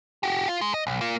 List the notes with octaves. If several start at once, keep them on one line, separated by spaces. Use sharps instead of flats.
F#4 G4
F4
G#3
D#5
B1
A#3 F4